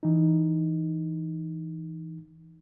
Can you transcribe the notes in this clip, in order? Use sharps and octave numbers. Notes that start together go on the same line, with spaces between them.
E3 D#4